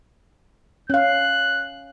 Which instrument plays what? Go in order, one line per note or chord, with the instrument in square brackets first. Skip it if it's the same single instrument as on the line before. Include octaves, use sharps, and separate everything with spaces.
[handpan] C#4 F5 [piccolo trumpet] F#6